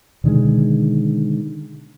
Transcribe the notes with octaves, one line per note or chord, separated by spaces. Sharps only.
B2 D3 D#3 G#3